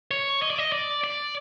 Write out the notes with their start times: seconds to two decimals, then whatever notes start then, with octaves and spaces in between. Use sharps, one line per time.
0.11 C#5
0.42 D#5
0.50 D5
0.58 D#5
0.72 D5
1.04 D5